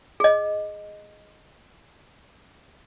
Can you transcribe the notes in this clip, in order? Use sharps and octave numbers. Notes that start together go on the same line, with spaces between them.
G#4 D#5